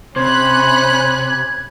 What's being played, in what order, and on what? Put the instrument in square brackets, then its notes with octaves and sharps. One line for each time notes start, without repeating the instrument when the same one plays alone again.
[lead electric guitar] C3 [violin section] C#4 B5 F#6 [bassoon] C5 [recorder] G#6